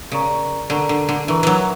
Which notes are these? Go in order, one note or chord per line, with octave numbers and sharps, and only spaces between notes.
C#3 A#4 D5 A#5 C#6
D3 A#4 D5 A#5 C#6
D3
D3
E3 A#4 E5 A#5 C#6
E3 F#3